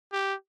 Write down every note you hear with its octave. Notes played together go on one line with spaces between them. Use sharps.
G4